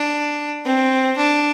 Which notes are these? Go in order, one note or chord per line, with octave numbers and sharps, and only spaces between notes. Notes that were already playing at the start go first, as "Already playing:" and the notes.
Already playing: D4
C4
D4